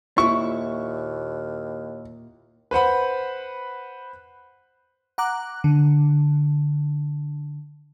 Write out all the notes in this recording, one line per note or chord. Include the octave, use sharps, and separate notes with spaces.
D#2 A#2 E4 C#6
B4 C5 F#5 B5
F#5 A#5 D6 F#6
D3